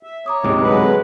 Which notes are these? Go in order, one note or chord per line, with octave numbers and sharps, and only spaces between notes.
E5
C#5 A#5 D6 D#6
D1 G#2 C3
F#3 G#3 B4
A4